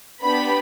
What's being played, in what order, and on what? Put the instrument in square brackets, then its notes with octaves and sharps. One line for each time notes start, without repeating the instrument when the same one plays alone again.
[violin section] B3 D4 G4 B5